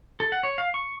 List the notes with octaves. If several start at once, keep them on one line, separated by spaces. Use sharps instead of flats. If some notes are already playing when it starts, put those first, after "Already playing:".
A4
F#5
C#5
F5
C#6